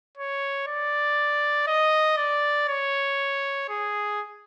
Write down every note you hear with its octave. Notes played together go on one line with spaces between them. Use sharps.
C#5
D5
D#5
D5
C#5
G#4